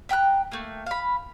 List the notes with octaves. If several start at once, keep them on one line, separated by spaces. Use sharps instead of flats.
E5 G5 A#5 F#6
A3 A#3
F5 B5